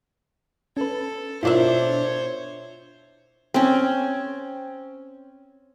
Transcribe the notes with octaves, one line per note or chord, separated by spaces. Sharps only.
C#4 A4 B4
B2 D4 E4 F4 A#4 C5 C#5 E5
C4 C#4